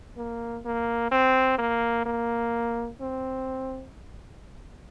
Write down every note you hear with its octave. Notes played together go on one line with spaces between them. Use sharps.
A#3
A#3
C4
A#3
A#3
C4